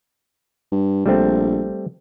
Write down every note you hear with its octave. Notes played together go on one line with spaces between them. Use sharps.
G2
A#1 G3 A3 C4